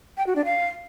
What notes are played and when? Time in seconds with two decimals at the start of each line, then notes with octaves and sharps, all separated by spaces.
0.17 G5
0.27 F#4
0.36 D4
0.45 F5